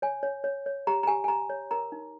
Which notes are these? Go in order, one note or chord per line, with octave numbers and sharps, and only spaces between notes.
C#5 G#5
C#5
C#5
C#5
G4 A#5
A#5
G4 G#5
G#5
G4 A#5
C#5
A#4 A#5
D#4